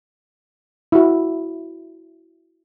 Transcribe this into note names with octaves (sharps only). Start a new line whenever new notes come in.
E4 F#4